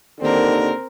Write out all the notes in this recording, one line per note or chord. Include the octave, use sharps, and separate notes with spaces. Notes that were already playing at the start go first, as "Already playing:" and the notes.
D#2 D3 D#3 C4 A#4